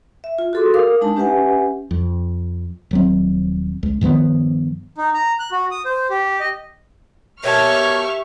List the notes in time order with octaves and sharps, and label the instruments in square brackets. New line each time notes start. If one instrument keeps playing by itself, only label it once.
[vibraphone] E5
F4
F#4 G#4 A4 C6 D6
A#4 F5 D6 D#6
G#3 D4 D#4 A5
C#4 G4 B4 E5 F#5 G#5
[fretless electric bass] F2
D#1 F#3 C4
C#2
G2 D#3 F3 B3
[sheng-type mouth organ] D#4
A#5
F#6
F#4
D#6
C5
G4
D#5
[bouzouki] B2 A#3 A5 [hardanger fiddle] G4 E5 [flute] C#5 [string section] C#6 F6